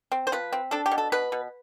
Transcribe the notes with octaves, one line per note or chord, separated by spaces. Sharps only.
C4
C5
F3 B4
C4
D4 A4
G4
B2
A4
B2 B4
B2